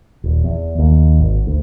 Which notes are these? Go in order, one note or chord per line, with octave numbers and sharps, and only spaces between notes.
D#1
E2
D#2
G#1
D2